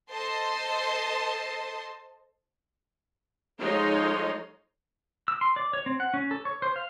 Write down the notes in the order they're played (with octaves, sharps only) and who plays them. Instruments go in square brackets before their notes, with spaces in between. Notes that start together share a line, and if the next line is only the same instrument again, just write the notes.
[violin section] A4 C5 D#5 A5 C6
[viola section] F3 G#3 D#4 A4 C#5 C6
[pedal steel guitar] E6
C6
D5
C#5
C4
F#5
C#4
A4
C#5
C5
F5